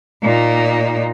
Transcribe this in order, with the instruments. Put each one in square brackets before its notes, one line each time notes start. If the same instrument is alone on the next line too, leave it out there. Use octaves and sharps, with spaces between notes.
[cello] A#2 D#4